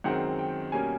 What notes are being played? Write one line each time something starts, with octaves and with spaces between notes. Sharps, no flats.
F#2 D#3 G#3 C4 F#5
G5
B2 G3 A#3 C#4 G#5